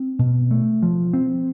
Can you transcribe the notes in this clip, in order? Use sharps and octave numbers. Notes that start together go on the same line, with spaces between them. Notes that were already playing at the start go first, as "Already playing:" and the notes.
Already playing: C4
B2
A3
F3
C4